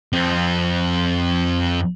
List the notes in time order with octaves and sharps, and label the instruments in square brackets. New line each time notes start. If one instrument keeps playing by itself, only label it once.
[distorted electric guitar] F2 C4